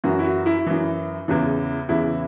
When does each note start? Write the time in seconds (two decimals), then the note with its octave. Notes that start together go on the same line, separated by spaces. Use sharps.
0.04 F#2 E3 F#4
0.19 E4
0.24 F#4
0.46 E4
0.67 F#2 E3
1.28 E2 C#3 E3
1.89 E2 C#3 E3 E4